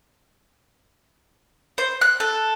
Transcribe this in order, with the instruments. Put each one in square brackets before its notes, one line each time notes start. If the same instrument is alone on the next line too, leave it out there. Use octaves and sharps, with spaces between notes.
[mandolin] C5
F#6
A4